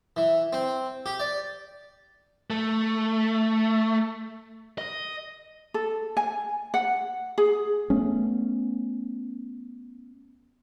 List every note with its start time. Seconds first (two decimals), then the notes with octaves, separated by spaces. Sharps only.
0.16 E3
0.53 C4
1.06 G4
1.20 D5
2.50 A3
4.78 D#5
5.74 A4
6.17 G#5
6.74 F#5
7.38 G#4
7.90 A3 B3 C#4